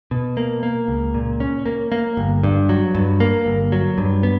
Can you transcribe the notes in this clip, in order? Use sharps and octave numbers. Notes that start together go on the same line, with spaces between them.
B2
A#3
A#3
C#2
A#2
C#4
A#3
A#3
G1
G2
F#3
G2
A#3
G1
F#3
G2
B3